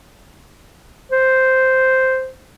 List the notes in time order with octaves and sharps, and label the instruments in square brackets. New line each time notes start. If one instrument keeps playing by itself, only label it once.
[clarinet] C5